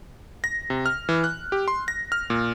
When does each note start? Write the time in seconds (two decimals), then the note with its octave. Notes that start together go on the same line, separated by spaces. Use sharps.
0.44 A#6
0.70 C3
0.86 F6
1.09 E3
1.24 F#6
1.52 G4
1.68 C6
1.88 A#6
2.12 F6
2.30 A#2